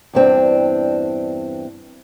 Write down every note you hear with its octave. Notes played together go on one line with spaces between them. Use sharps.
E2 G2 C4 D4